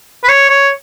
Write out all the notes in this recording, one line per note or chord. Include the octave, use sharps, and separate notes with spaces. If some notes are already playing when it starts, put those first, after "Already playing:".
B4
C#5
C#5